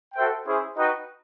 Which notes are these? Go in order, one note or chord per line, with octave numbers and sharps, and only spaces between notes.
F#4 A4 C5 E5 G5
C#4 E4 G#4 C5
D#4 F#4 B4 D#5 G5